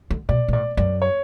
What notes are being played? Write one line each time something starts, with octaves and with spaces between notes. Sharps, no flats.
D3
B2 D5
B2
A2 D5
F#2 D5
C#5